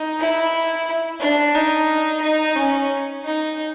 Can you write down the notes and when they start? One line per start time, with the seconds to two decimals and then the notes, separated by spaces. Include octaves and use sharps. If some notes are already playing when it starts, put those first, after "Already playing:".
Already playing: D#4
0.20 E4
1.20 D4
1.54 D#4
2.21 D#4
2.56 C#4
3.24 D#4